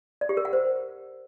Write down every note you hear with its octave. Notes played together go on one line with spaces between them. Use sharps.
D5
G4
A#4
F#5
C5